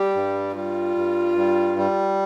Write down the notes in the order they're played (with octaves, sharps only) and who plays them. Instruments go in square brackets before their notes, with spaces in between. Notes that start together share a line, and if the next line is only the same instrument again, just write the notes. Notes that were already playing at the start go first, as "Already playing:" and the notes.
Already playing: [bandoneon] G3 [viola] G4
[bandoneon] G2
[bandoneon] G3 [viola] F4
[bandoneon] G2
G3
G3